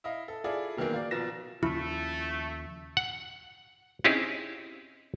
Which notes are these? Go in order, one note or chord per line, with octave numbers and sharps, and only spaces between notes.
E4 D#5 F5
A4
E4 F4 G#4 A4 D5
B2 D#3 E3 F#3 A#3
D5 F5
B1 B2 F3 A6 A#6 E7
D#2 C#3 F3 A3 E4
F#5
C4 C#4 D#4 E4 G4 G#4